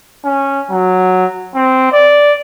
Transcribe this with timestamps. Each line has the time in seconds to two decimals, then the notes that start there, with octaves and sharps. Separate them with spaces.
0.25 C#4
0.71 F#3
1.55 C4
1.92 D5